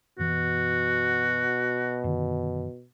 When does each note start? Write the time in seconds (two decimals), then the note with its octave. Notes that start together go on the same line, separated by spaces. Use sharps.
0.19 F#2 B2 E3 F#4
2.04 F#2 D3 D#3